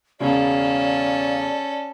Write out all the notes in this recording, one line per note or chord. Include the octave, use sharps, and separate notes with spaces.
E1 C#3 C#4 A4 D5 F5